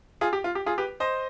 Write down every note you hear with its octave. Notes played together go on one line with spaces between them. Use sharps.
F4 G#4
G4
F4
G4
F4 G#4
G4 B4
C5 D#5